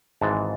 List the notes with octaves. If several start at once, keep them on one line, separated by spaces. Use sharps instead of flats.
G#1 G#2 E3 G#3 A5